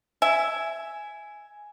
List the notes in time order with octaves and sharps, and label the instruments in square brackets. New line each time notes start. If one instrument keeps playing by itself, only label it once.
[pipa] E5 [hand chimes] G#5